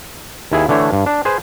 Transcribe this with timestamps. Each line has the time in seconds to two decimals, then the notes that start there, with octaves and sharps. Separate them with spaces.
0.52 D#2 E4 G#4
0.69 D3 E3 A3 D4 C#5
0.93 G2
1.06 D4
1.25 G#4 B4 C5 G#5